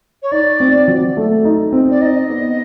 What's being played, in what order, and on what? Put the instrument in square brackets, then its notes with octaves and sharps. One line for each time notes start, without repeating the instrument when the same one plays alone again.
[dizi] C#5
[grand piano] D#4 [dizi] D5
[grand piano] C4
F#3
A3
D#4
C4
[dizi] D5
[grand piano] D#4 [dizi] D#5
[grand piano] B3